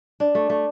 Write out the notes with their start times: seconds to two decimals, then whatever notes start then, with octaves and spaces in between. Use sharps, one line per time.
0.20 D4
0.35 A3
0.50 A3